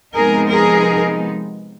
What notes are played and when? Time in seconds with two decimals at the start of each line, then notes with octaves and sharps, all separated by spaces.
0.14 C3 F3 G#3 B3 D#4 G#4 A#4
0.50 G#4 A#4